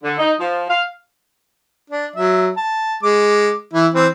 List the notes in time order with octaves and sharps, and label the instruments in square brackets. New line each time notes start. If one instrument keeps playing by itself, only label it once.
[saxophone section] D3
D#4
F3
F5
[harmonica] D4
F#3 E5
A5
G#3 D6
E3 E4
E3 C4